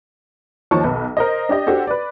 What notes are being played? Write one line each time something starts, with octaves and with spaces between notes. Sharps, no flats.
D#2 F3 D#4 C#5 A5 C#6
B1 B4
A#4 C5 D#5
D4 G4 D#5
D4 F#4 G4 A4 C5
B4 D5